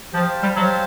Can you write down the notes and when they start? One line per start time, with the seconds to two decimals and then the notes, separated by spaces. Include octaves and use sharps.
0.13 F3 G4 C5 F5 A5
0.43 G3
0.56 F#3 G4 C5 F5 A5